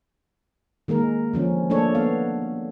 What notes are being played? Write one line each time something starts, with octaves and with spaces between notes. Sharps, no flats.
D#3 G#3 A#3 A#4
D3 F3 C#4
A3 A#3 D4 A4 C#5
B3 F5